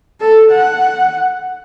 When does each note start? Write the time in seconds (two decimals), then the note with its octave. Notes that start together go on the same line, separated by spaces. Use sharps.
0.21 A4
0.51 F#5